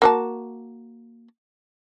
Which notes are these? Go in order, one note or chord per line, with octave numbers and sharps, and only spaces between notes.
A#3 F#4 A5